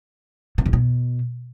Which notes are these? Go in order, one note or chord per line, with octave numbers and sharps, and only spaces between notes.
C3
E2
B2